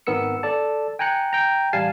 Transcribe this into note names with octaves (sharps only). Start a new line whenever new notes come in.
G#1 D#3 B3 A#4 E6 C#7
A4 D5 A5
G5 G#5 A#5 F#6 C#7
G5 A#5
A1 G3 F5 G#5 A5 C7